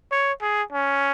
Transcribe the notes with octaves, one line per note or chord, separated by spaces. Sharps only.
C#5
G#4
C#4